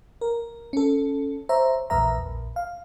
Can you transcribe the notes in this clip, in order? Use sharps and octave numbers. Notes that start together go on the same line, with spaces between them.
A#4
C#4 A4
C5 C#5 E5 A#5
A#1 E2 B4 E5 A#5
A#1
F5